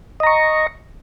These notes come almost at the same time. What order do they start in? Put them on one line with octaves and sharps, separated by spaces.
D#5 A#5 C#6